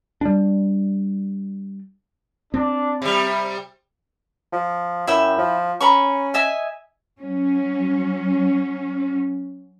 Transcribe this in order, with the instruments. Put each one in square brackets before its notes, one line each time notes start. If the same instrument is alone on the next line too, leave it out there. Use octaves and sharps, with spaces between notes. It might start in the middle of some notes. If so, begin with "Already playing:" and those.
[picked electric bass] G3 D4
[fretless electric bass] C4 [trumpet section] D4
[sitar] C3 G3 [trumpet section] B5
[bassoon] F3
[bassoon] F#2 [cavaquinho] E4 E5 G5
[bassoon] F3
[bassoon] C#4 [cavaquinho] A#5 B5 C#6
[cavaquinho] D#5 E5 G#5
[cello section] F#3 C#4